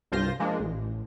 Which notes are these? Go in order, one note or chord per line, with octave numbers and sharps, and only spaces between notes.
C2 G2 F4 C5 C6 A#6
F3 G#3 A#3 D4
A1